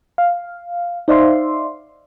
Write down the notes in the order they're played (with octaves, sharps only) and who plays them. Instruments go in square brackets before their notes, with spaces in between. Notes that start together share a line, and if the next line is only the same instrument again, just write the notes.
[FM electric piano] F5
D#4 C5 D5 E5 F5 C6